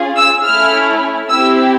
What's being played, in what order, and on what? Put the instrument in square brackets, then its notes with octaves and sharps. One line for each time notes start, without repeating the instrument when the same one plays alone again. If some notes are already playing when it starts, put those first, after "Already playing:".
Already playing: [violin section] C#4 F4 G#4
E6
A3 C#4 E4 F6
C4 E4 G4 E6